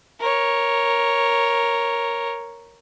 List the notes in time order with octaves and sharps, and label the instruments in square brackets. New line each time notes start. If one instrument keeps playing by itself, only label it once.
[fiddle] A#4 C#5